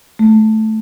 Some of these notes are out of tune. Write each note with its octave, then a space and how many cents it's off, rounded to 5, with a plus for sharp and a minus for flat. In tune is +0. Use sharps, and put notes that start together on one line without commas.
A3 -10